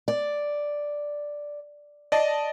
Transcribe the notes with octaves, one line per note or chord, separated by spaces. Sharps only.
D5
D5 D#5 A5